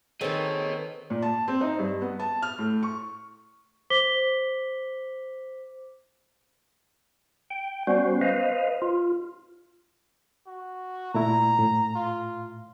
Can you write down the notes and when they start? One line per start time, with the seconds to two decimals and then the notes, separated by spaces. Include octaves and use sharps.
0.21 D#3 C4 G#4 A4 B4 C#5 D#5
1.10 A#2
1.22 A5
1.48 C4
1.61 D#4
1.79 G2
2.01 B3
2.20 A5
2.42 F6
2.59 A2
2.83 C#6
3.90 C5 D6 B6 G7
7.50 G5
7.87 G3 B3 C#4 F#4 C5
8.21 B4 C5 D#5 F5
8.82 F4
10.47 F#4
11.14 A#2 A3 E4 A#5
11.59 A2
11.95 F4